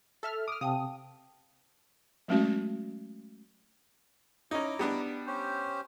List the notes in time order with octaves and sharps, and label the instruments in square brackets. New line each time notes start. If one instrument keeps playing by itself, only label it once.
[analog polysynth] A4 E5 F6
[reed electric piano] D6 [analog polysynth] D#6 F6
[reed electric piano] C3 [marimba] F5 G5 A5 [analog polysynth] D#6
[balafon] F#3 G#3 A3 C#4 F#4
[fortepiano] C#4 D#4 [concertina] E4 A#5 D6
[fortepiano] G3 B3 D4
[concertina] C#4 G4 C5